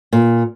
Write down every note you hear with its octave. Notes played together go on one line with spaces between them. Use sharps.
A#2